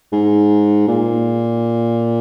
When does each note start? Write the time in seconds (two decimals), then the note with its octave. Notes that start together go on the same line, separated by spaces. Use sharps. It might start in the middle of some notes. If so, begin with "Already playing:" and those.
0.13 G#2
0.88 A#2